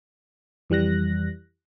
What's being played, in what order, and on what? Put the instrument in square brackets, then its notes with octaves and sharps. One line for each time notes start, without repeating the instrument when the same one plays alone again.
[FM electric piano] F2 E3 G3 F#6 A#6